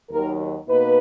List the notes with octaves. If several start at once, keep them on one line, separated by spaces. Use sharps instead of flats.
D#2 D#3 F#3 A#4
B2 A#3 D#4 B4